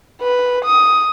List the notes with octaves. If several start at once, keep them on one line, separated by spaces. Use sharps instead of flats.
B4
D#6